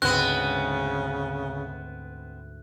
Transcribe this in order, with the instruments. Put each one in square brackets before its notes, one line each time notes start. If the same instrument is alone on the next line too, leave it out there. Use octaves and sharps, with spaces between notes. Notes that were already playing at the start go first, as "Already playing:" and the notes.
[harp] D2 G#2 [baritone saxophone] C#3 [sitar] B3 C4 [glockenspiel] F#6